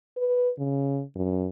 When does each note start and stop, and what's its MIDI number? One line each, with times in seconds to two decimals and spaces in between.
0.17 0.50 71
0.58 1.02 49
1.15 1.47 42